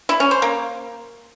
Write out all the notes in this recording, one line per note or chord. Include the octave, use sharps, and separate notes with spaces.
E4
C#4
C5
A#3